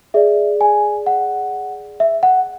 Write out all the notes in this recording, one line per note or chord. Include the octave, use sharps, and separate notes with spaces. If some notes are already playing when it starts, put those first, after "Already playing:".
G#4 D5 E5
G#5
F#5
E5
F#5